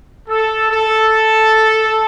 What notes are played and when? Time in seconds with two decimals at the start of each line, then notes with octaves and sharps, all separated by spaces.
0.29 A4
0.70 A4